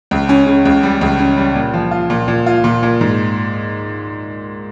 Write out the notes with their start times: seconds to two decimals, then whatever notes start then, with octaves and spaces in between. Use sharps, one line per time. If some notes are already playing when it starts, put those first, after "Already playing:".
0.11 C#2
0.29 C#4
0.47 C#3
0.65 C#2
0.83 G3
1.01 C#2
1.19 C#4
1.37 G3
1.55 A#2
1.74 F3
1.91 F4
2.10 A#2
2.28 A#2
2.46 F4
2.64 A#2
2.83 A#2
3.01 G#2